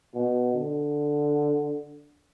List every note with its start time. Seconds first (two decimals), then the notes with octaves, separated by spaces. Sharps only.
0.14 B2
0.54 D3